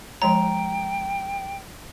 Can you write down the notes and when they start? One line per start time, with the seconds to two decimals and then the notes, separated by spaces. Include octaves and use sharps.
0.22 F3 G#3 C#5 G5 A#5